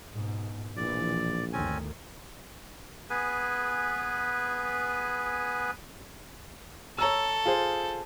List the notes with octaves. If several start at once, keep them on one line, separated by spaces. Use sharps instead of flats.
G#2 B2
A#1 B2 E3 F3 D5
G1 D2 D#3 C4 C#4 G#5
B3 G#4 B4 G#5
A4 C#5 A#5 E6
F4 G#4 C5